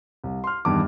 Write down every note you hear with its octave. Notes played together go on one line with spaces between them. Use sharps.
C2
C6 F6
E2 G2 D#3 D6